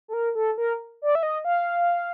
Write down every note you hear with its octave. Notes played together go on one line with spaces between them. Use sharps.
A4
A#4
A4
A#4
D5
E5
D#5
F5